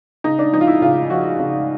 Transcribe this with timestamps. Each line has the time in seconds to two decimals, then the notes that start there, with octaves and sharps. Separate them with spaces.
0.24 C#3 D#4
0.39 D4
0.53 F3 D#4
0.61 F4
0.68 E4
0.82 C#3 F4
1.10 F3 F#4
1.39 C#3